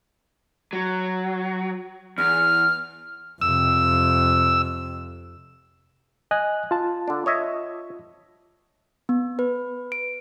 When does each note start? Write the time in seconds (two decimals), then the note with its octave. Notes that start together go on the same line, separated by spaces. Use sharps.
0.73 F#3
2.18 E2 F6
3.41 F2 C3 E6
6.31 D#5 G#5 F#6
6.71 F4 A5
7.08 D3 D4
7.26 C#5 D#5 E5
9.09 B3
9.39 B4
9.92 D7